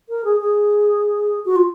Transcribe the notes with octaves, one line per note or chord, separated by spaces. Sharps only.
A#4
G#4
G#4
F#4
F4